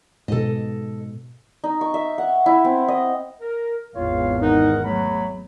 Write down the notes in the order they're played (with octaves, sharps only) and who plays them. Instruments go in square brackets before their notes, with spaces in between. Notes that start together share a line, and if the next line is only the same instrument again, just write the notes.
[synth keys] G#2 B2 [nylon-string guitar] A4 D#5
[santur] D#4
C#6
E5
F#5
E4
C4
D#5
[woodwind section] A#4
[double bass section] G#1 E2 G#2 [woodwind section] F4 C#5 F5
[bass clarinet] D#4 [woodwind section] A#4 F#5
[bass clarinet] F#3 [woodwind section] A3 B5